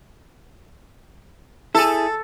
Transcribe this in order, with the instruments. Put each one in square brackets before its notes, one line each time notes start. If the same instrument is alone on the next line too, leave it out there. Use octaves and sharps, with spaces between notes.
[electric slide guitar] E4 G#4 [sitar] A4